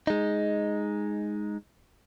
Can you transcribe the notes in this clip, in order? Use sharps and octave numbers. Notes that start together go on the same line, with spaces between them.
G#3 D#4